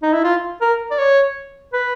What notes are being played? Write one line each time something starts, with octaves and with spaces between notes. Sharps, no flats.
D#4
E4
F4
A#4
D5
C#5
B4